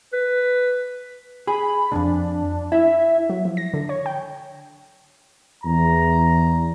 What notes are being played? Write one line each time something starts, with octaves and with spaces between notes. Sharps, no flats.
B4
G#4 B5
B1 F2 D4
E4 E5
F#3
F3
A#6
D3
C#5
G5
E2 A#5